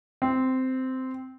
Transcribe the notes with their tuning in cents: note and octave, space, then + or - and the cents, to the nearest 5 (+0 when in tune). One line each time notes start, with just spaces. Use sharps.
C4 -10